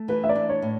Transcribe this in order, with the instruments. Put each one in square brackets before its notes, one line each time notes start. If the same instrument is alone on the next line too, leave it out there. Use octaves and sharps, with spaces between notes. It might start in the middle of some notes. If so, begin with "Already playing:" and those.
Already playing: [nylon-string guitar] A3
[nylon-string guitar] E3 [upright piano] B4
[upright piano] E5
D5
[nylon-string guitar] D4
[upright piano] C#5
[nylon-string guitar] A2